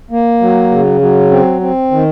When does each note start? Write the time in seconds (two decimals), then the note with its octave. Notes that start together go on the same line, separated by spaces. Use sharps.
0.11 A#3
0.41 F#3
0.71 C#3
1.01 F#3
1.31 C4
1.61 C4
1.91 D#3